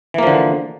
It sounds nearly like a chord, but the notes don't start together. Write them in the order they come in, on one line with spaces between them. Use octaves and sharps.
E3 A#3 F3 D3